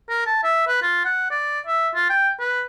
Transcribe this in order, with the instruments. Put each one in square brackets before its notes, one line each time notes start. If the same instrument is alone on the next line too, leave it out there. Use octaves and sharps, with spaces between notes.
[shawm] A#4
A5
E5
B4
F4
F#5
D5
E5
F4
G5
B4